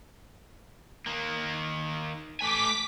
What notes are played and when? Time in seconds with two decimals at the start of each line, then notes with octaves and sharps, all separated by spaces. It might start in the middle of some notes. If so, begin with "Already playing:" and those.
1.06 D#3 A#3
2.41 A3 G#5 D6 B6